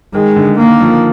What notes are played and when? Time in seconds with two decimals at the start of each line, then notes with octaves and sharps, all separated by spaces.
0.14 D#3 G#3
0.36 D3
0.58 D#3 A#3
0.80 F3